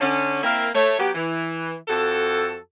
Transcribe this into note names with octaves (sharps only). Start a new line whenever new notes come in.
D3 C#4
A#3 C4 E4 A#4 F5
A3 C#5
F#3 B3 G4
E3
F2 F#4 A4